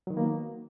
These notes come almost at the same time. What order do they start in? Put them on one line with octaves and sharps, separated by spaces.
F#3 D#3 B3 A#3